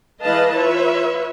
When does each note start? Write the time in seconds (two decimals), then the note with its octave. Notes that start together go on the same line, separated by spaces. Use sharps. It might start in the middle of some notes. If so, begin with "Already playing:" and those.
0.22 E3 G#3 B4 D#5 F5 A5
0.53 F4 B4 C#5 E5